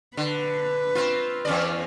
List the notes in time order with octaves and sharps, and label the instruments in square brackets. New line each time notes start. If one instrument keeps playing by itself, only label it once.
[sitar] D3 [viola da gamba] B4
[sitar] C4 F4
E2 C#4 D5